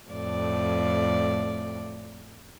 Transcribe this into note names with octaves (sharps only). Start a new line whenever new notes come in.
F2 A2 D5